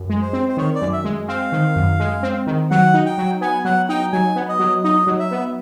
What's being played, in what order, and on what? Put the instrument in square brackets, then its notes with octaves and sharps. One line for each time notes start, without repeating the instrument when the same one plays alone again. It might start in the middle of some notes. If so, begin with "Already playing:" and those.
Already playing: [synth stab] F#2
G#3
[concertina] C5
[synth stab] C4
[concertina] C5
[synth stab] D#3 [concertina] C#5
[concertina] D5
[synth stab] F#2
[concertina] E5
[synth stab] G#3
[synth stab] C4 [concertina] F5
[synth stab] D#3
F#2
G#3
C4
D#3
[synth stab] F#3 [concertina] F#5
[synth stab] D#4
[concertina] G5
[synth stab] F#3
[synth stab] B3 [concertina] G#5
[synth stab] F#3 [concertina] F#5
[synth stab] D#4 [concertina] G5
[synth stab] F#3 [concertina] G#5
[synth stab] B3
[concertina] D#5
[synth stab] F#3
[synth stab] D#4 [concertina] D#5
[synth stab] F#3
[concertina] E5
[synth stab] B3